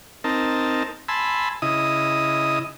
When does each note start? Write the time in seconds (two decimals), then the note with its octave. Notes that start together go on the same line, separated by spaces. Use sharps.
0.24 C4 D#4 A#4 A5
1.09 G#5 A5 B5 C6 E6
1.62 C#3 E4 D#5 D#6